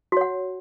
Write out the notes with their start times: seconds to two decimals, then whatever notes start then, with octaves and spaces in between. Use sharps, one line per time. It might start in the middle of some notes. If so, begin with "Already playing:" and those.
0.12 F#4
0.17 C#5
0.21 F#5